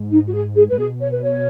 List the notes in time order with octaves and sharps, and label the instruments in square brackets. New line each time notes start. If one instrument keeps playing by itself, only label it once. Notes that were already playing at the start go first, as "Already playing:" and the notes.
Already playing: [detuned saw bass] G#2
[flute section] D#4
F#4
G#4
G#4
[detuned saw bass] G#2 [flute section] B4
[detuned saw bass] B2 [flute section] G#4
[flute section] C#5
B4
C#5